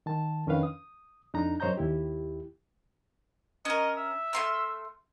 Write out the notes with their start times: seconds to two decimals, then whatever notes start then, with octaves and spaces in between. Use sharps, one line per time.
0.06 D#3 A5
0.47 F2 D#3 C#4 D4 B4 F5
0.63 D#6
1.33 F2 D4 D#4 A#5
1.60 F#2 C5 C#5 D#5 A#5 G6
1.77 D#2 E4 G4
3.65 C#4 A#4 D#5
3.98 E5
4.33 A3 C6 F6